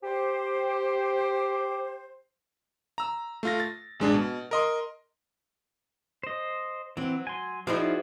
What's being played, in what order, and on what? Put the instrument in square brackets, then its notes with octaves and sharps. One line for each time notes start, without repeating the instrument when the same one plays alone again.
[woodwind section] G4 C5
[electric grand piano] A#5 E6
A3 F4 A#6
A6
A1 G#3 D4 G#4
B2
A#4 D#5 C6
[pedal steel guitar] C5 D#5
[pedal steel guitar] E3 C4 [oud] F#3
[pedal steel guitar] G#5 C6
[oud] F3 D#4 E4 [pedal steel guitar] F#4 G#4 D5